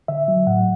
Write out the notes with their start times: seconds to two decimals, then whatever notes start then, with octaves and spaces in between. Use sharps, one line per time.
0.08 D3 E5
0.28 F#3
0.47 A2 F#5